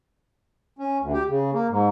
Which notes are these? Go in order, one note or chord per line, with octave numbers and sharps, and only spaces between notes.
C#4
D2
G4
C#3
A#3
G#2